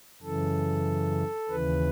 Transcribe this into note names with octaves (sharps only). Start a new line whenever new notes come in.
F#2 C#3 E3 A4
D#2 C#3 E3 B4